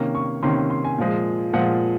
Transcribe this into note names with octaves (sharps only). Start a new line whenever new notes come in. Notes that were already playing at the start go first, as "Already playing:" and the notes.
Already playing: C3 D#3 A#3 C#4
C#6
C3 D#3 A#3 C#4 C6
C6
C6
G#5
A#2 F3 G#3
A#2 F3 G#3 F#5